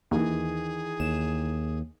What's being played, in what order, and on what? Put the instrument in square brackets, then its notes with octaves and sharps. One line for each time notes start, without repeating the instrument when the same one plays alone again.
[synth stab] D#2 [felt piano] D#3 E3 [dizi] G#4
[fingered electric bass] D#2 [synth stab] E7